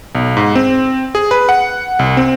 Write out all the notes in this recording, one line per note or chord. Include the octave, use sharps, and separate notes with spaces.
B1
G#2
C4
G#4
B4
F#5
C2
C4